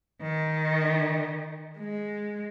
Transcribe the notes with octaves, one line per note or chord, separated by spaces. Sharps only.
D#3
G#3